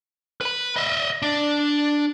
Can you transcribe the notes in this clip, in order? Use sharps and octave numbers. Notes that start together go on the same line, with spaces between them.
B4 B5
D#5 E5
D4